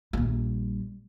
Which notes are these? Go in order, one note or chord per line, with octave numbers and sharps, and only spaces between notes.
A#1 G3